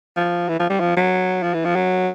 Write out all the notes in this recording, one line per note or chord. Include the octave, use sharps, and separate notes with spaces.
F3
E3
F3
G3
F3
F#3
F3
E3
F3
F#3